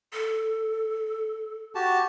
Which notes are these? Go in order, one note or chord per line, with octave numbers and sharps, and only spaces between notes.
A4
F#4 G4 A5